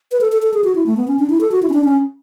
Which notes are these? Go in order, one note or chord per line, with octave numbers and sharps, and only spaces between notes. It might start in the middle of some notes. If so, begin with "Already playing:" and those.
B4
A4
A4
A4
G#4
F#4
E4
A3
B3
C#4
D4
E4
A4
F#4
E4
C#4
D4
C#4